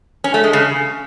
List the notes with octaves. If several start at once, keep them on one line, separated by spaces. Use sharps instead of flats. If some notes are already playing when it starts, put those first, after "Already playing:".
C#4
A3
G#3
C#3